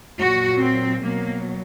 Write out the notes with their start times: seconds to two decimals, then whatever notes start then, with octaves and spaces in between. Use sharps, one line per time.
0.19 A#2 F#3 F#4
0.60 C4
1.01 B2 F#3 A#3